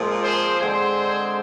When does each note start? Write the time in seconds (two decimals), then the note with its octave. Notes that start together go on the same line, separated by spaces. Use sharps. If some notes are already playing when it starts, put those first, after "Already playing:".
Already playing: A#2 F3 G#3 C4
0.23 G#4 C5
0.60 D3 G#3 C4 G#4 C5